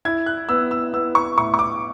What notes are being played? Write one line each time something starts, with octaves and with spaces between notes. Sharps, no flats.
E4 G#6
F#6
B3 E6
E6
B3 E6
C#6
A2 C#6
C#6
D6